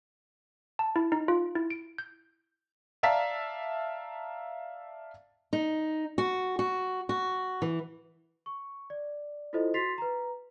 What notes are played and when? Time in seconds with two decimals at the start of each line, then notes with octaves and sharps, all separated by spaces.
0.79 A5
0.96 E4
1.12 D#4
1.28 F4
1.55 E4
1.70 D7
1.98 G6
3.03 D5 E5 F5 A5 A#5 B6
5.53 D#4
6.18 F#4
6.59 F#4
7.09 F#4
7.62 E3
8.46 C#6
8.90 D5
9.53 E4 F4 A4 C5 D#5
9.74 F#4 C6 A6 B6 C7 F7
9.98 B4 A#5